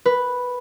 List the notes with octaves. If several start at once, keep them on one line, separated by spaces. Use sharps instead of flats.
B4